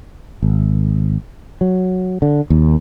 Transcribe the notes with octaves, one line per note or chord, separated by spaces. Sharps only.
G#1
F#3
D3
D#2